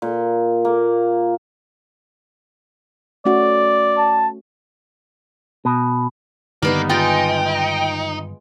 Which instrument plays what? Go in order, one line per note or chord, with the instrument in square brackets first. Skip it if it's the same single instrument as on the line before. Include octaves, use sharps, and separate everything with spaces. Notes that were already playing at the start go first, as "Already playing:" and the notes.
[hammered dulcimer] A#2
A#3
[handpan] A3 C#4 F#4 [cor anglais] D5
[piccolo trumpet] A5
[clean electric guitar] B2
[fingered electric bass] G2 D3 D#3 [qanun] G3 B3 D#4 [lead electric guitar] A#3
[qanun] G#3 F4 D5 [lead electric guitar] D#4 [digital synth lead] G5